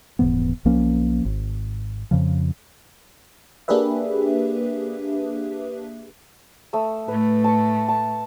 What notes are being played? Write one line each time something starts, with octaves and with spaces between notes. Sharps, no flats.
D#1 G#2 E3 B3
B1 F3 A#3 C#4
G#1
F2 C#3 F3
A#3 D4 G4 G#4 B4 E5
A3 D#6 E6
A2 A3 B4
A5 C#6
A5